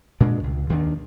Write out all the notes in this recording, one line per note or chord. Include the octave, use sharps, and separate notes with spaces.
A#2 G#3 D4
C#2
D#2 D#3 D4